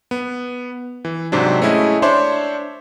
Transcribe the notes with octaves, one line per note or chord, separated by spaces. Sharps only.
B3
E3
G#2 C3 F#3 C4 D4
G#3 A3 C#4 E4 G#4 D#5
D4 C5 C#5 E5 C6 D6